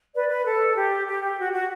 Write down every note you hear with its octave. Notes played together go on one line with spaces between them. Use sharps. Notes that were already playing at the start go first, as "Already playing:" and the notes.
B4 D5
B4
A4
G4
G4
G4
F#4
F#4